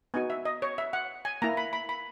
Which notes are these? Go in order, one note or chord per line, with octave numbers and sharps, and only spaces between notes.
B3 D#4 F#4 G#5
E5
D#5
C#5
E5
F#5
G#5
A#3 E4 A#5
B5
B5
B5